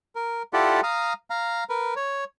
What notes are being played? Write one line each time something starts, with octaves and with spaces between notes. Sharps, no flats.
A#4
E4 F4 G4 A4 D5 F#5
F5 A#5 D#6
F5 A#5
A#4 B4
C#5